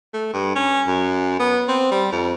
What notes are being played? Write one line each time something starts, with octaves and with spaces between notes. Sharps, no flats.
A3
G2
C#4
F#2
B3
C4
G3
F2